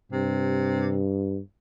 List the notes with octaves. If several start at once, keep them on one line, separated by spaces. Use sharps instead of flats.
G2 C3